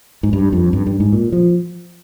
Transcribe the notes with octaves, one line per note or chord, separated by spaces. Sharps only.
G#2
G2
F2
G2
G2
G#2
A#2
F3